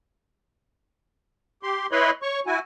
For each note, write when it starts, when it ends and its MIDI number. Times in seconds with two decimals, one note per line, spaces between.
1.63 1.87 67
1.63 1.87 84
1.92 2.11 64
1.92 2.11 71
1.92 2.11 73
1.92 2.11 75
1.92 2.11 83
1.92 2.11 84
2.22 2.40 73
2.22 2.40 85
2.47 2.59 64
2.47 2.59 66
2.47 2.59 80